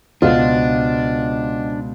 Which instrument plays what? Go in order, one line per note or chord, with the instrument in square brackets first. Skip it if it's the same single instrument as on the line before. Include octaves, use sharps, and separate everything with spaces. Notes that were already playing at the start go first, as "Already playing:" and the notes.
[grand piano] C#2 B2 [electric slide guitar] D4 [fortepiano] F4 [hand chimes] C5 D#5 F#5